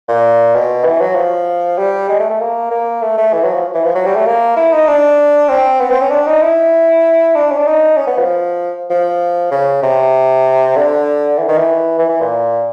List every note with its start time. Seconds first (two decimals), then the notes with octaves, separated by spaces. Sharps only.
0.08 A#2
0.55 B2
0.85 E3
1.01 F#3
1.16 F3
1.78 G3
2.09 G#3
2.19 A3
2.30 A3
2.41 A#3
2.70 A#3
3.02 A3
3.17 A3
3.33 E3
3.44 F#3
3.54 F3
3.74 E3
3.84 F3
3.95 F#3
4.06 G3
4.15 A3
4.26 A#3
4.56 E4
4.73 D#4
4.88 D4
5.49 C4
5.80 B3
5.90 C4
6.01 C#4
6.11 D4
6.26 D#4
6.42 E4
7.35 D4
7.51 C#4
7.58 D4
7.66 D#4
7.96 C#4
8.07 B3
8.18 F3
8.90 F3
9.51 C#3
9.83 C3
10.76 D3
11.38 E3
11.48 D#3
11.58 E3
11.99 E3
12.09 E3
12.20 A#2